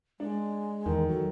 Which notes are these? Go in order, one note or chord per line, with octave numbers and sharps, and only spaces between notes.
G#3 D4
E2 D#3
F#3 A4